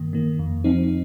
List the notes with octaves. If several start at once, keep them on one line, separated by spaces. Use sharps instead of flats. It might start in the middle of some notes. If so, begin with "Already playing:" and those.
Already playing: G2 D#3 A#3
D#3 A#3
F2
F3 C4 D#4